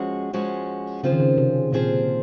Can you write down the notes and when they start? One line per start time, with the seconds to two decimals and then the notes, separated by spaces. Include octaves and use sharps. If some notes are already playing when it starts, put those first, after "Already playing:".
Already playing: F3 G#3 C#4 F#4
0.33 F3 G#3 C#4 F#4
1.03 C#3 F3 C4 F4 G#4 C5
1.12 D#3
1.20 C#3
1.38 C3
1.73 A#2 F3 C4 F4 G#4 C5